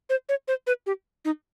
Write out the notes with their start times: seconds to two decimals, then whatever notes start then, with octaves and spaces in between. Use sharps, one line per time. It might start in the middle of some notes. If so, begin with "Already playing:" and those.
0.10 C5
0.29 C#5
0.48 C5
0.67 B4
0.86 G4
1.25 D#4